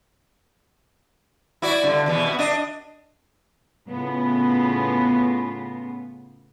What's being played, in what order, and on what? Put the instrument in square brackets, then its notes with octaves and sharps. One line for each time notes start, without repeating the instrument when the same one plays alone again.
[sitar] E4 F#4 D5
G2 D3
E2 B2 E3
B3 F#4
D4 D#5
[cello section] A2 C#3 B3 F4